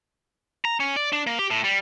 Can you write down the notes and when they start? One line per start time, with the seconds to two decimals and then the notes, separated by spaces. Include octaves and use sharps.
0.65 A#5
0.80 C#4
0.96 D5
1.13 D4
1.27 A#3
1.39 G4
1.50 A2
1.64 G3